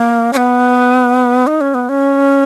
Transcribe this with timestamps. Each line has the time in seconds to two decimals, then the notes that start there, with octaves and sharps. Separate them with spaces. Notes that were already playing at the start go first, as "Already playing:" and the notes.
Already playing: A#3
0.33 C#4
0.37 B3
1.47 D#4
1.61 C#4
1.74 B3
1.89 C#4